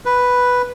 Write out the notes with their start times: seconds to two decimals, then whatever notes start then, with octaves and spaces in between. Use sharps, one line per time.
0.05 B4